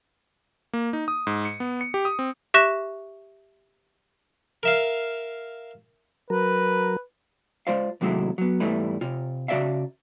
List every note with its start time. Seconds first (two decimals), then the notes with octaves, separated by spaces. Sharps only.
0.73 A#3
0.93 D#4
1.08 D#6
1.27 G#2
1.45 C#7
1.60 B3
1.81 C#7
1.94 G4
2.05 D#6
2.19 C4
2.54 G4 E5 C#6 F#6 A#6 E7
4.63 A#4 E5 F5
6.30 F#3 A#4 B4
7.67 G#3 F4 C5 D5 F5
8.01 D#2 C3 F#3 G#3 A3 E4
8.38 F#3 B3
8.60 E2 G#2 G3 A3 E4 B4
9.01 C3 F4
9.48 C#3 F#4 B4 D5 E5 F5